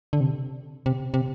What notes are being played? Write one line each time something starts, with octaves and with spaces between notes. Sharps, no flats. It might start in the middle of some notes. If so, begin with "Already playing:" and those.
D3
C3
C3
C3